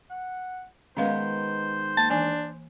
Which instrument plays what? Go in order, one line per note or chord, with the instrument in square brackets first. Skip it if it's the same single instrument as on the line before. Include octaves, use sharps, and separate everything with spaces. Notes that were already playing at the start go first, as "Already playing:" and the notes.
[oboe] F#5
[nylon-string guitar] D#3 G#3 B3 [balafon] C#4 F5 [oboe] C5
[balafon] A#3 [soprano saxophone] A5
[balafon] E3 G#5 [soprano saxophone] D4